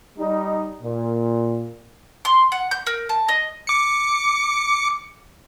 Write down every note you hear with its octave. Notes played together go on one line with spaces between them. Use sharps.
G3 D#4
A#2
C6
F#5
G6
A#4
A5
D#5
D6 C#7